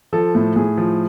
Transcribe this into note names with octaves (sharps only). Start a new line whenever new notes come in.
F3 A4
A2
A2 G#4
F3